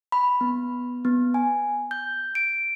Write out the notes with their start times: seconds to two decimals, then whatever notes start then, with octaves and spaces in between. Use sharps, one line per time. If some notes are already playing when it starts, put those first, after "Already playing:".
0.12 B5
0.41 B3
1.05 B3
1.34 G#5
1.91 G6
2.35 D7